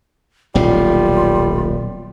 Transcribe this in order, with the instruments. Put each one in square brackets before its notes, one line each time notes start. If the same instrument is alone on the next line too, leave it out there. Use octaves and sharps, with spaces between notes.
[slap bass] D#1 B1 A2 [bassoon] G3 [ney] F4